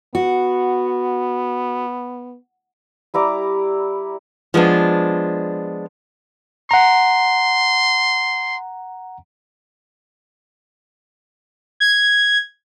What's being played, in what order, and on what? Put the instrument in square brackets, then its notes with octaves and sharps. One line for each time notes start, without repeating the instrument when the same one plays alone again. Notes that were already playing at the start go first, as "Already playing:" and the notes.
[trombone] B3 [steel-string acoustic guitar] F#4
[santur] G3 E4 A#5 D6
[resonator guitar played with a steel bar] F3 G#3 B3 D4
[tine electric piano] F#5 A#5 [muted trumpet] C6
[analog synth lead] G#6